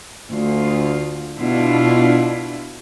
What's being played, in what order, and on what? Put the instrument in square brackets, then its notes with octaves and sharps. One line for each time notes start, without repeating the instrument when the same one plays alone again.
[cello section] D2 F4
B2 D4 E4 F4